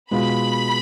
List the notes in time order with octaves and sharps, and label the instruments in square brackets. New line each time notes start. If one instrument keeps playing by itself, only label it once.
[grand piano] B2 G#3 B3 F4 [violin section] B5